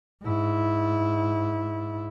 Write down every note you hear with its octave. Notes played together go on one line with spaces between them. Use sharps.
G#2 E4